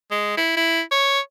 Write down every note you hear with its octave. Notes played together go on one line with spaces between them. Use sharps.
G#3
E4
E4
C#5